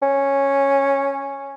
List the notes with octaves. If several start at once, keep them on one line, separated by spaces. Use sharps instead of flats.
C#4